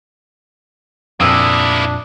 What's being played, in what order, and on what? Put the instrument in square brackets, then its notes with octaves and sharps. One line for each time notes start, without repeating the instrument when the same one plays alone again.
[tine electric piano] F2 A#2 [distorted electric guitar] A#3 E4 [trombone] D4 [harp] D#6 E6 F#6